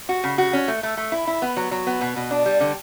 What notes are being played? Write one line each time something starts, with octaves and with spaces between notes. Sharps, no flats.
F#4
C#3
F#4
C#4
A3
A3
A3
E4
E4
B3
F#3
F#3
B3
B2
B2
D4
G3
D3